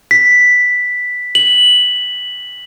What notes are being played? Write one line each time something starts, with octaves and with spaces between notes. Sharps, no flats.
B6
F#7